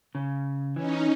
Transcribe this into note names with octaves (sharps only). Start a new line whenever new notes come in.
C#3
E3 C#4 D#4